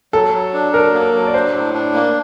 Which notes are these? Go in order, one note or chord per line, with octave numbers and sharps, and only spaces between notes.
F#3 A4
F#3
D4
F#3 A#4
A#3
F#3
D5
D4 C5
A2
D4
A#3